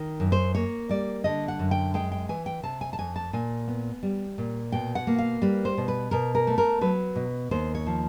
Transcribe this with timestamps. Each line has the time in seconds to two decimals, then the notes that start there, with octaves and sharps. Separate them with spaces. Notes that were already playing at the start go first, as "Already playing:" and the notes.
Already playing: D#3
0.20 F#2
0.32 C5
0.55 A#3 C#5
0.89 G3 D5
1.24 D3 D#5
1.48 F#5
1.59 F#2
1.71 G5
1.94 G#3 G5
2.12 G5
2.29 E3 G#5
2.46 G5
2.63 C3 A5
2.81 G#5
2.93 A5
2.99 F2 G#5
3.16 A5
3.33 A#2 G#5
3.68 B3
4.03 G3
4.38 A#2
4.72 B2 G5
4.95 F#5
5.07 A#3
5.18 F5
5.42 G3 B4
5.65 C5
5.78 B2
5.88 B4
6.11 B2 A#4
6.35 A#4
6.47 A3
6.58 A#4
6.81 F#3 B4
7.16 B2
7.51 D#2 C5
7.75 C#5
7.86 F3